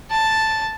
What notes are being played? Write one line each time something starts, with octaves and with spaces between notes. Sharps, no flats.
A5